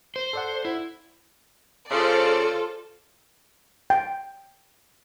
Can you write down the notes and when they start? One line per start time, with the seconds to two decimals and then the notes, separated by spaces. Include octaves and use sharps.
0.16 C5
0.33 A4 D5 F#5
0.65 E4
1.91 C#3 F4 A4 C5 D5 C#7
3.90 G5